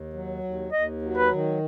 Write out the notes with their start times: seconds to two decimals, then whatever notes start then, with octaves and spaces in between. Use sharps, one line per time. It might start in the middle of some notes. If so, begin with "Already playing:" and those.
Already playing: D#2
0.13 F#3
0.43 D#2
0.72 D#2 D#5
1.02 F#3
1.17 B4
1.32 D#3